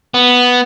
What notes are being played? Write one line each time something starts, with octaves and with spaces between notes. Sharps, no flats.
B3